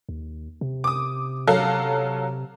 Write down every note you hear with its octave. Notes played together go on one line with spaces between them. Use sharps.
D#2
C3
D6 D#6
F#3 A4 F5